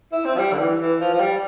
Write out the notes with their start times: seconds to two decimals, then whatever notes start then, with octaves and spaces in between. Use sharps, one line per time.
0.12 E4
0.25 C4
0.35 F3
0.39 G3
0.53 D3
0.59 E3
0.80 E3
1.00 F3
1.13 F3
1.20 G3